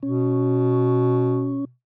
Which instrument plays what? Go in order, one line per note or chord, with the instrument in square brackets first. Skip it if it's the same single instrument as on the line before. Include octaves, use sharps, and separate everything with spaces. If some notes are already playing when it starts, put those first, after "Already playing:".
[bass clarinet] B2 [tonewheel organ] C#4